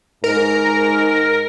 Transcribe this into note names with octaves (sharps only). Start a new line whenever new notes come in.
G#2 A#4